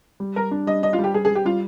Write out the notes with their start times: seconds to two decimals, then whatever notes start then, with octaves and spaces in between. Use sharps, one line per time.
0.20 G3
0.36 G3 A#4
0.51 D4
0.67 G3 D#5
0.83 D4 D#5
0.93 F4
0.99 G3 G4
1.14 G3 G#4
1.25 G#4
1.31 G3 G4
1.45 G3 F4